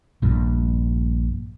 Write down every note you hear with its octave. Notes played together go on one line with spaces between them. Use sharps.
A#1 G2 A#2